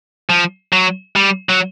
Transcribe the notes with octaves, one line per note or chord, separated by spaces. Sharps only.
F3
F#3
G3
F#3